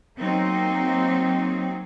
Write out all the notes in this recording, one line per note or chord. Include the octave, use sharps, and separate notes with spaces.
F#3 A#3 C4 D#4